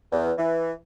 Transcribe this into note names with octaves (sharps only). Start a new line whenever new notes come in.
E2
E3